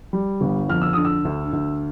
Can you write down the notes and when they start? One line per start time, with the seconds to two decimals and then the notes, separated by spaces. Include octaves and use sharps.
0.13 G3
0.41 G1
0.69 F2 F6
0.82 E6
0.93 D3 D#6
1.05 E6
1.25 D2
1.53 D2